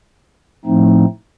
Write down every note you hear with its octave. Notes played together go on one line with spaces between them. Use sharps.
A2 F3 A3 C4 D#4